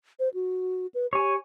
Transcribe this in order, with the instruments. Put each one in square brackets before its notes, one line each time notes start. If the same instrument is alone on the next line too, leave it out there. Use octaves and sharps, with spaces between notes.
[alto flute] C5
F#4
B4
[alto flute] G4 [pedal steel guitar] C#5 G#5